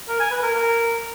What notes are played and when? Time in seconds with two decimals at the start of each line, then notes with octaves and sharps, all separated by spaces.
0.09 A#4
0.20 G#5
0.31 B4
0.42 A#4
0.54 A#4